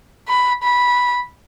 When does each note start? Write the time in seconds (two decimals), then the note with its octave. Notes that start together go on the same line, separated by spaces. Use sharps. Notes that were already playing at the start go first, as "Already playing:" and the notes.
0.29 B5
0.63 B5